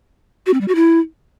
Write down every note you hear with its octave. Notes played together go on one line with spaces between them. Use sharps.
F#4
C4
G3
F#4
E4